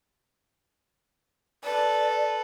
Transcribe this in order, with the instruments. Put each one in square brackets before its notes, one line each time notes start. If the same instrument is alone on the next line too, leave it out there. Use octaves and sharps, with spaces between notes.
[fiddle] A4 B4 [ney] D5